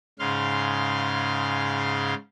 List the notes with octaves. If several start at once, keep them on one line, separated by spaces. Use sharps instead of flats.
G#2 C#3 F5 C6